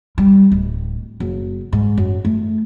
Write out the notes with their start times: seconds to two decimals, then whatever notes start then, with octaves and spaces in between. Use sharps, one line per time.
0.18 G3
0.51 D1
1.20 F#1
1.73 G#2
1.98 F#2
2.25 A3